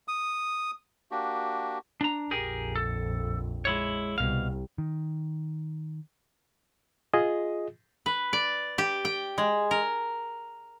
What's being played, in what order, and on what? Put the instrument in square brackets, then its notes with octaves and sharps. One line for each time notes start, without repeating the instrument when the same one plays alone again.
[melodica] D#6
[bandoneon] A#3 D4 F#4 G4
[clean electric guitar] D4 A#5
[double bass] A#1 F2 [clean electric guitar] G4 G#4 A#4
[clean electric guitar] A4
G#3 E4 C#5
[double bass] C2 [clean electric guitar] B2 F5
[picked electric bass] D#3
[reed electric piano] F4 G#4 D#5
[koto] B4
D5
G4
G5
G#3
A#4